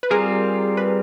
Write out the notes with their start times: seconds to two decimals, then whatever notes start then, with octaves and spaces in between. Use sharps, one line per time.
0.03 B4
0.11 G3 C4 F4 G#4 A#4
0.77 B4